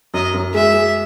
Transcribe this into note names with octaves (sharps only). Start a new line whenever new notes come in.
F#2 D#5
F#2
G#3 E5
G#3